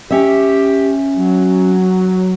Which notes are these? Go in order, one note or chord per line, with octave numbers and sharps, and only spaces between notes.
C#4 G4 E5
F#3